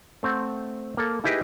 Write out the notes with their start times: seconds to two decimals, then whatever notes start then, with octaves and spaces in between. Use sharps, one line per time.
0.23 A3 C4 F#5
0.97 A#3 A4
1.24 D#4 E4 G4 G#4 B4 D#5